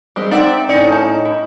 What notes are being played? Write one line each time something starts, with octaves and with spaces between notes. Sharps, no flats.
G3 G#3 C4
C4 D#4 D5 E5 F#5
A2 C#4 D#4 D5
A5
E4